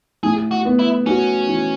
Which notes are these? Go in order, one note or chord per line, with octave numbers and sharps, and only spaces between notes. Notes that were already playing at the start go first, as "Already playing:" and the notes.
A2 G#4
F#4
B3
E4
C#4 F#4
E3